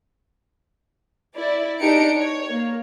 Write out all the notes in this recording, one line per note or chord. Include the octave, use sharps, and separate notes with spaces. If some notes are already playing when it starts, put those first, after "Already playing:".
E4 D5
D4 D#4 G4 C#7 D7
C#5
A#3